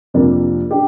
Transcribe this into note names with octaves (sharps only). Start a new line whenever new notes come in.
F2 C3 F3 A#3 D4
D4 G4